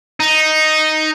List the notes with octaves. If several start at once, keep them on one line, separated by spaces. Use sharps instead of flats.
D#4